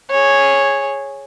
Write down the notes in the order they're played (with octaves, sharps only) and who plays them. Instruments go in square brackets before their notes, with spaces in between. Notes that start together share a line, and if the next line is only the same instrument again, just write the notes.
[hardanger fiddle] G#4 C#5